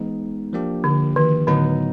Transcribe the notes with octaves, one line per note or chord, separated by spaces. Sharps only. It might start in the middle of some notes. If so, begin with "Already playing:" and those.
Already playing: E3 G#3 B3 D#4
F3 A#3 D4 G4
D3
D#3
A2 D3 F#3 B3 D#4